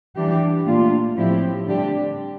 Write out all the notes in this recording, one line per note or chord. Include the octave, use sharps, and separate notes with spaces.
E3 G3 D4 G4
A#2 A3 D4 F4
A2 F3 C4 E4 G4
D3 G3 D4 G4